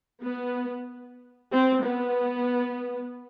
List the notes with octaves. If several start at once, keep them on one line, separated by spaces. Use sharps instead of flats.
B3
C4
B3